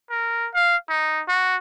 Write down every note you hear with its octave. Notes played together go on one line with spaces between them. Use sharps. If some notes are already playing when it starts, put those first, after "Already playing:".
A#4
F5
D#4
F#4